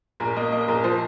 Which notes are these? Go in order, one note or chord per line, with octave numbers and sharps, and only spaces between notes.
A#1 A#4
A#3 D#5
A#3 D#5
A#1 A#4
F3 C5